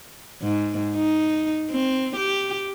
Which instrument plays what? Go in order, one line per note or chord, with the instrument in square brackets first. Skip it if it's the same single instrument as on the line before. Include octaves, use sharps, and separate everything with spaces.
[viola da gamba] G#2
D#4
C4
G4